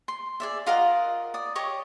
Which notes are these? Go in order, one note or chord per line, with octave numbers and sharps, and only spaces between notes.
C6
G#4 D5 E5
F4 A#4 D#5 F#5
D5 D#6
G4 C#5 D#5 C#6